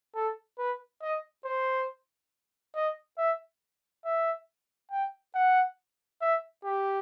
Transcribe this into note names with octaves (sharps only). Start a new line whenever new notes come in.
A4
B4
D#5
C5
D#5
E5
E5
G5
F#5
E5
G4